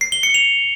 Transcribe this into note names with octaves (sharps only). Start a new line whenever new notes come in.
C7
G7
C#7
F7